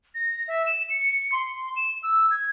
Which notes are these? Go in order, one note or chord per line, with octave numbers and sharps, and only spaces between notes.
A#6
E5
E7
C#7
C6
E7
E6
G#6